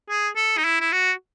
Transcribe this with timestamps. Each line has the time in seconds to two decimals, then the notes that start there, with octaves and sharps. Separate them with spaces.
0.09 G#4
0.36 A4
0.57 D#4
0.64 E4
0.81 E4
0.92 F#4